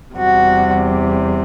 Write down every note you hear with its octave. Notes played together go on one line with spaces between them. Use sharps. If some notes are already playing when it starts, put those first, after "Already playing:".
E2 C3 G3 F#4